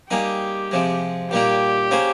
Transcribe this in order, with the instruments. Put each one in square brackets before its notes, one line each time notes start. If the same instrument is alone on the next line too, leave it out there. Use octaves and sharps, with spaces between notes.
[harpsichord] G3 A#3 D#4 G#4 [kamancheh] G4
[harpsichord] C3 F3 G#3
[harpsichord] A#2 G3 A#3 D#4 [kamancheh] G4
[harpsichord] A#3 C#4 G#4 C5